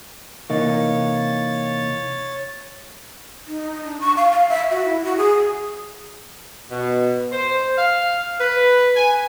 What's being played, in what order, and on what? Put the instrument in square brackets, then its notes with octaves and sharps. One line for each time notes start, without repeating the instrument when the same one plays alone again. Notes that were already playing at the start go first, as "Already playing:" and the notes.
[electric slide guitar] C3 E3 D#4 [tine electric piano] A#3 D#5 F5 [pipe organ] C#5 A6
[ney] D#4
D4
C#6
F5
F5
E5
F#4
E4
F#4
G#4
[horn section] B2
C5
F5
B4
G#5